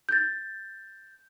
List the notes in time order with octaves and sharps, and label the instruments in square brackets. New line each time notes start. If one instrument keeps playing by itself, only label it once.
[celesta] G6 A6